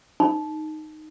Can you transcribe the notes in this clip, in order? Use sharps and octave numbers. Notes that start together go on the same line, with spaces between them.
D#4